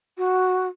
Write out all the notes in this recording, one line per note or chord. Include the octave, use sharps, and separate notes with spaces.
F#4